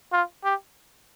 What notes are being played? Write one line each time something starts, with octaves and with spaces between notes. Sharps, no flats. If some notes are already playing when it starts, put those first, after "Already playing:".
F4
G4